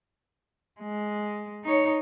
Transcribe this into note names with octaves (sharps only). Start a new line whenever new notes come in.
G#3
D#4 C#5